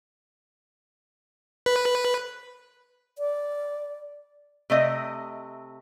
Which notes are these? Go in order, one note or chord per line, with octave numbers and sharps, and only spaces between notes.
B4
D5
C3 A3 D#5